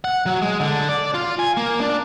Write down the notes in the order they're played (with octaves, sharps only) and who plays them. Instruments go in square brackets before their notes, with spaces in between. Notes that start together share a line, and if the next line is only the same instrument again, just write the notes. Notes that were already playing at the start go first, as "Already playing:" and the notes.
[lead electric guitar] F#5
F#3
G#3
D3
D5
F4
G#5
A#3
D4